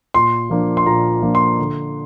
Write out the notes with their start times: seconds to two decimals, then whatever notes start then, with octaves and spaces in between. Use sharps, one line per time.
0.14 A#2 C6
0.50 F3 A#3 D4
0.77 C6
0.86 A#2 A#5
1.22 F3 A#3 D4
1.35 C6
1.59 D3